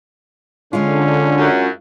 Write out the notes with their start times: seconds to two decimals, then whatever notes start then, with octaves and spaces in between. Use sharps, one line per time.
0.73 D3 G#3 C#4 D4 F4
1.38 F#2